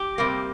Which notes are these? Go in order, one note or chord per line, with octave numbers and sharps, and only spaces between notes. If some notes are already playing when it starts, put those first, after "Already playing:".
Already playing: G4
C3 G3 A#3